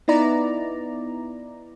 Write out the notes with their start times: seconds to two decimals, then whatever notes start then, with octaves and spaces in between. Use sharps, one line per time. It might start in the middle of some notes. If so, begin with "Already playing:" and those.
0.08 B3 D#4 E4 D5 A#5